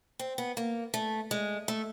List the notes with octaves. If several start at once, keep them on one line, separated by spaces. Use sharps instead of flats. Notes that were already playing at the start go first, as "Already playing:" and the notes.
C4
B3
A#3
A3
G#3
A3